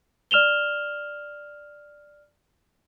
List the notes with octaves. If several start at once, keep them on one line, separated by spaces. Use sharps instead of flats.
D5 F6 E7 F7 G7